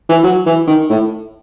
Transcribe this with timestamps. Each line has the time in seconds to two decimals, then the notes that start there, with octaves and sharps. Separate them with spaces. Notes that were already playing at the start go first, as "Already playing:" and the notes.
0.09 E3
0.24 F#3
0.46 E3
0.67 D#3
0.89 A2